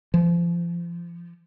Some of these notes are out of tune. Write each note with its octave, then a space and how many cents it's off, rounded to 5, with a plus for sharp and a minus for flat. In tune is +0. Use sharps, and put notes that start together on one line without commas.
F3 -30